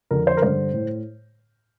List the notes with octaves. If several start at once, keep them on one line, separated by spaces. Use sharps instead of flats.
F2 D3 A#4
C5
A#4
G2 D3 C5
A2